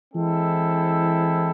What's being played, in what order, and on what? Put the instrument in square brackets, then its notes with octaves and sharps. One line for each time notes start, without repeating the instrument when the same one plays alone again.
[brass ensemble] E3 G#3 C4 E4 A4